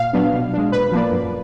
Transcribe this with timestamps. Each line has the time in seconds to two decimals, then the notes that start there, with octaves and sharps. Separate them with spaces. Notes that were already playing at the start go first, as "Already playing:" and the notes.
Already playing: A#2 F5
0.13 F#3 B3 D4
0.34 B2
0.53 G#3 D4
0.72 A#2 B4
0.92 F3 A#3 D4
1.12 F#2